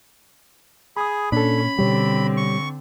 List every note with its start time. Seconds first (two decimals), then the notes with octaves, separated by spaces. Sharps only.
0.97 G#4 B5 D#6
1.32 A#2 C#4 D4 A4 B5
1.78 B2 D3 G3 C4 G4 C#5
2.37 C#6